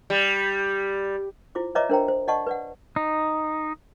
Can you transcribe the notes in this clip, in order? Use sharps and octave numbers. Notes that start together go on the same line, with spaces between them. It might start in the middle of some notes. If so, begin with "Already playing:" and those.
G3
E4 F4 C5 D6
B4 C#5 D#5 E5 A#5 D6
D4 A#4 C5 G5 A#5
C5
D5 D#5 F#5 A5 C#6
B4 D5 F#5
D#4